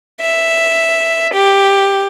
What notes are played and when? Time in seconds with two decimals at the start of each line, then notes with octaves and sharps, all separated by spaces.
0.20 E5
1.32 G4